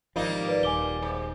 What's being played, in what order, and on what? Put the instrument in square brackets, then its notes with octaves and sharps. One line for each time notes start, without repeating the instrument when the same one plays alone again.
[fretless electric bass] G#1 F3 [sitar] G3 A#3 D#4
[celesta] B4 D5
[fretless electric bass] D#1 [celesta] G#5 D6 G7
[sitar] G#2